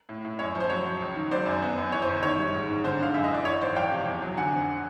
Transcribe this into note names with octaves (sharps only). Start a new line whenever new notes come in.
A2
A2
F#2 C#5
F3
C5
F#3 C#5
F#3
C#2
D#3
F#3 C5 D5
F#2
B3
F#2
E3 C#5
C5
G1
D#3 C#5
G3
G#2
G#2
D3 C5
D3 F5
F#2 E5
D#5
E3 D5
E3 C#5
G#1 C5 D5
F3 F5 G5
C3
E2
F#3
D3 F#5 G#5
F2